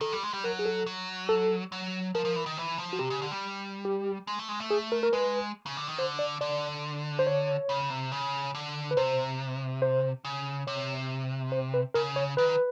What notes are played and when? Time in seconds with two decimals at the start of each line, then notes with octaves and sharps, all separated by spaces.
0.01 D#3 A4
0.12 G3
0.23 G#3
0.33 G3
0.44 F#3 A#4
0.59 G#4
0.65 A4
0.86 F#3
1.29 A4
1.72 F#3
2.15 F3 A#4
2.25 F3
2.36 E3
2.46 D#3
2.58 E3
2.78 F3
2.93 F#4
2.99 C3 G4
3.10 C#3
3.22 D3
3.31 G3
3.85 G4
4.27 G#3
4.39 A3
4.49 G#3
4.60 A3
4.71 G#4
4.92 A#4
5.03 A#4
5.13 G#3 B4
5.66 C#3
5.77 D3
5.87 D#3
5.98 D3 C5
6.19 D5
6.41 D3 D5
7.19 C5
7.27 C#5
7.69 C#3
7.90 C3
8.12 C#3
8.55 D3
8.91 B4
8.97 C3 C5
9.82 C5
10.25 C#3
10.67 C3 C#5
11.52 C5
11.74 B4
11.94 C#3 A#4
12.16 C#5
12.37 D#3 B4